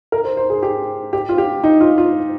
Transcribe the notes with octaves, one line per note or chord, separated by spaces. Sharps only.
A#4
C5
C5
G#4
G4
G4
F4
G4
D#4
F4
F4